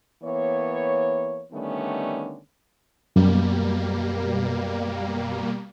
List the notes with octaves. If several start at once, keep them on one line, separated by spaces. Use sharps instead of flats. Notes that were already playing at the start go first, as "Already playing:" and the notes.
E3 A#3 B3 C#5
D3 D#3 G3 A3 B3 C#4
F#2 B2 G3 A#3